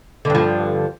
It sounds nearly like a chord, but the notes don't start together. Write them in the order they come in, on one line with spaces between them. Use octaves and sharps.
D3 G2 F3